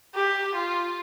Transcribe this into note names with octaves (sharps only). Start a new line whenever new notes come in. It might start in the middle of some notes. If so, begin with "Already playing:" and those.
G4
F4